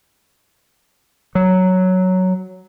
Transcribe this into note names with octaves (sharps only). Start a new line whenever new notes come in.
F#3